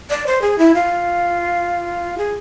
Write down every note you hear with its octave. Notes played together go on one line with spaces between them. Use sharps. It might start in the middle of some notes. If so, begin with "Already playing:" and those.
D5
C5
G#4
E4
F4
G#4